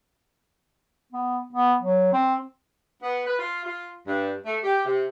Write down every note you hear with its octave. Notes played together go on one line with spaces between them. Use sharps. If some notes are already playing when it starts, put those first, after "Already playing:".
B3
B3
F#3
C4
B3
B4
F4
F4
G2
A3
G4
C3